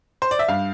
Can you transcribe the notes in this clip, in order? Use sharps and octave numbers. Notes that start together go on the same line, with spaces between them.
C5
D5
E5
G2 F5